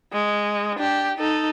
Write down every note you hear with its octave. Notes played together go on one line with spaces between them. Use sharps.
G#3
D4 G4
D#4 A4